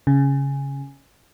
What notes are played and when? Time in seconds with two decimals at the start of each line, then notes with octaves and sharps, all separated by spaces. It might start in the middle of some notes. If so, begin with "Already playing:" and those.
0.07 C#3